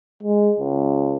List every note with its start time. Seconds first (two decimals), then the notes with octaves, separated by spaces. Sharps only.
0.23 G#3
0.60 C#2